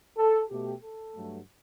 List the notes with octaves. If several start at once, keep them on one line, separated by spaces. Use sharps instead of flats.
A4
B2 A3 G4
A4
G2 F#3 A3